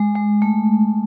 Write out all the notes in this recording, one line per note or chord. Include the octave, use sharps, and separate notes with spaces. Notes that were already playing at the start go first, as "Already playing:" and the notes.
Already playing: G#3
G#3
A3